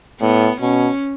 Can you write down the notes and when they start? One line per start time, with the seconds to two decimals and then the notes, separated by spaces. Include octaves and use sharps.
0.21 A2 B3
0.61 B2 C#4